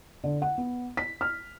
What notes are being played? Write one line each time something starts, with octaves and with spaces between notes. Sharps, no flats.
D3
F#5
B3
B6
F6